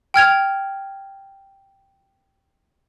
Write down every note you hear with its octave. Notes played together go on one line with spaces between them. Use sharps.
G5 F6 G#6 F7